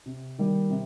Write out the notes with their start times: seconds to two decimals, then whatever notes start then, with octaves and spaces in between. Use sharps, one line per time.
0.06 C3
0.38 D#3 G3 A#3
0.70 C3